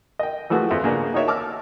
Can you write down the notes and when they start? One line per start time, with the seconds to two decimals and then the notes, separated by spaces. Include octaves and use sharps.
0.19 D#5 G5
0.50 E3 F3 A3 F#4 G#4 B4
0.70 F2 E5
0.84 C#3 A#3 B3 D4
1.14 D#4 F#4 A#4 C#5 D5 E5
1.28 A5 D6 E6 F6